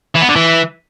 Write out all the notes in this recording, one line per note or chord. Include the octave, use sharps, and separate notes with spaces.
E3
B3
D3
E3